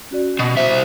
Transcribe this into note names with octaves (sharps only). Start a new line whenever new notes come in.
C#4 F#4 D5
B2
C2 C5 E5